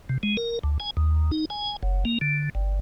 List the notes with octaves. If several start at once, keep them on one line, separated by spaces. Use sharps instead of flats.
C3
G#3
A#4
D2
G#5
D#2
D#4
G#5
F#1
A#3
D3
G1